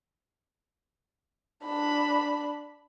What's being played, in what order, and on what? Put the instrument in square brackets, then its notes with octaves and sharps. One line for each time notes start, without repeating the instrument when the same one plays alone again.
[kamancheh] D4 B5